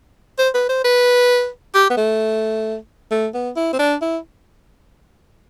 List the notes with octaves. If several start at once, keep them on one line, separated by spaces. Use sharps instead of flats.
C5
B4
C5
B4
G4
B3
A3
A3
B3
E4
C4
D4
E4